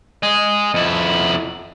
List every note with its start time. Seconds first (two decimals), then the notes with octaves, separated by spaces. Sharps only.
0.23 D#5 G#5
0.74 F2 E4